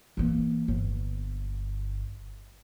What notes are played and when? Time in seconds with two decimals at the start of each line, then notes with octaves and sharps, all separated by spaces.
0.17 E3 A#3
0.68 G1